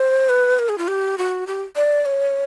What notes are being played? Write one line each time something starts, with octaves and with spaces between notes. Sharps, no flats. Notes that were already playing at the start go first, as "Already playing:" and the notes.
Already playing: C5
B4
A#4
G#4
F4
G4
F#4
G4
D5
C#5